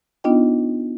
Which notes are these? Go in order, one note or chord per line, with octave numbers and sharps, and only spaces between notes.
B3 D4 D#4 F4 D#5 G5